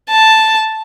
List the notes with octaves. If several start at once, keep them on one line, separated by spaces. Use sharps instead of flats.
A5